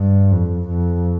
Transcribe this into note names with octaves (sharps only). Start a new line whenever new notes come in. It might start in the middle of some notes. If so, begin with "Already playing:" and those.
Already playing: G2
F2
F2